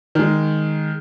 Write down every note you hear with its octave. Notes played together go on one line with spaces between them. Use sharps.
D#3 G#3